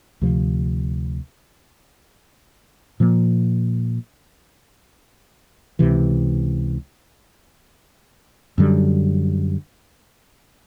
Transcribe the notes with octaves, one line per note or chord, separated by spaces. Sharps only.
D2 C3 F3
A#2 F3 A#3
C#2 C3 E3
F#2 D3 G3